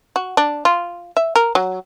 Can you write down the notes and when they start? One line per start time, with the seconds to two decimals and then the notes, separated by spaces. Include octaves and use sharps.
0.16 F#4
0.37 D4
0.65 F4
1.17 E5
1.36 A#4
1.55 F#3